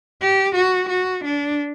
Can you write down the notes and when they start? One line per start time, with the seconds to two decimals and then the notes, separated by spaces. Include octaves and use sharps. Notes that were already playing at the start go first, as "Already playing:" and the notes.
0.22 G4
0.56 F#4
0.89 F#4
1.25 D4